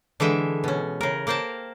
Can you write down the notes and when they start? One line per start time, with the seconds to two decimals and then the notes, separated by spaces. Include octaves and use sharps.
0.20 D3 E3 G#3 E5 G5
0.64 B2 C#4
1.01 C#3 A#4
1.27 A#3 A#4 C5 G5 A5